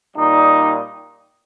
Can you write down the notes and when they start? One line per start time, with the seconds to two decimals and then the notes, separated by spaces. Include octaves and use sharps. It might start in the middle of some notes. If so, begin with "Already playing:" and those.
0.17 A#2 G3 D#4